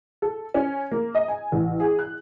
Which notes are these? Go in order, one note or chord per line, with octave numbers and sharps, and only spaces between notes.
A4
C#4
A#3
D#5
G#5
A1
G#4
F#6